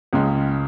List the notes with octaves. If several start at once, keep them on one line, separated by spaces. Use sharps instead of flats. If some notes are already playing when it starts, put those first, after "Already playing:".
C#2 C#3 G#3